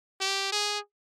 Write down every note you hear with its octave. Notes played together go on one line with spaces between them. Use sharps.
G4
G#4